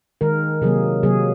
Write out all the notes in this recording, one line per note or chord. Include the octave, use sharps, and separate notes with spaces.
D#3 G#3 A#4
C3 F#3 A#3 G#4
C3 F#3 A#3 G#4